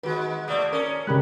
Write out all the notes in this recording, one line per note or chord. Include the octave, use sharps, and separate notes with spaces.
D#3 G#3 F#4 B4
A3 A#3 D5 D#6
C#4 A#4
C#3 G#3 G4 A#4 B5 F#6